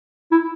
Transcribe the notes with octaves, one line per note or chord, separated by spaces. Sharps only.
E4